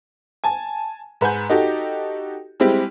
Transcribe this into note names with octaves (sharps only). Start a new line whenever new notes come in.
G#5 A5
G#2 B4 F#5 G#5 G6
D#4 F#4 G4 A4
G3 G#3 C4 E4 G4